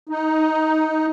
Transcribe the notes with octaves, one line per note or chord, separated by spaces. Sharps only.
D#4